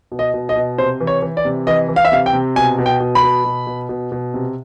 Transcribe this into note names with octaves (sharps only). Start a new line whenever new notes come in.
B2
D#5
B2
D#5
B2
C3 C5
E3
C#5
E3
D5
C3
E3 D#5
E3
F5
E5
C3 F5
G5
C3
B2 G#5
B2
G5
B2
B5
B2
B2
B2
B2
B2
C3